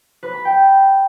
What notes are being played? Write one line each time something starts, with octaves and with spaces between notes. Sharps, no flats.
B4
B5
G5